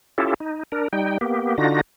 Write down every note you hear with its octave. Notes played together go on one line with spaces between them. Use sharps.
C#4 E4 F4 G4 A4
D#4
D4 A#4
G3 D#4 G5
A#3 B3 G4
D3 D4 D#4 F4 F#4 A#6